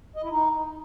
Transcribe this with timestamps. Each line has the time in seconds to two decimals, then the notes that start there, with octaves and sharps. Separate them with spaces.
0.16 D#5
0.23 E4
0.31 D#4